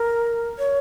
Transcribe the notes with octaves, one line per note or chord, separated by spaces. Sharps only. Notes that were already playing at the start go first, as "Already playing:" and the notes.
Already playing: A#4
C#5